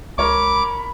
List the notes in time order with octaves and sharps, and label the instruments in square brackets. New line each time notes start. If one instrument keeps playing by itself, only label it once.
[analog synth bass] C#2 [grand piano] A#4 C#5 C#6 [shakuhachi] B5 [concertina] D6